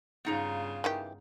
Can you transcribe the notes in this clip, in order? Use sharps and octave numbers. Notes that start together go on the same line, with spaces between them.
G2 C#3 B3 D#4 F4 A#5
D#3 E3 G4